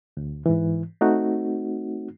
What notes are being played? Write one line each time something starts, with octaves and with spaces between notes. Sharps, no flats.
D2
G#2 E3
A3 C4 D#4 F#4